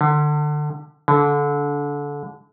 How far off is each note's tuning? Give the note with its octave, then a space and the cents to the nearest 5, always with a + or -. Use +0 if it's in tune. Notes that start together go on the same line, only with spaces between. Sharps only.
D3 +25
D3 -25